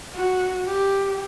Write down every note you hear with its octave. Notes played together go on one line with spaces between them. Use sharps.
F#4
G4